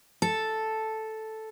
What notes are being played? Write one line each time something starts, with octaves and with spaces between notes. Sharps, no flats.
A4